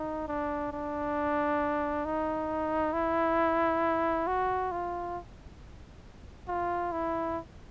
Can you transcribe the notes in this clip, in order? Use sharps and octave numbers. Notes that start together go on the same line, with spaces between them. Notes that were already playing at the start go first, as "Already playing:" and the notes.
Already playing: D#4
D4
D4
D#4
E4
F#4
F4
F4
E4